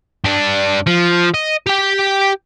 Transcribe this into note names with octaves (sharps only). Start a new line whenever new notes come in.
G2 D4
F3
D#5
G4 G5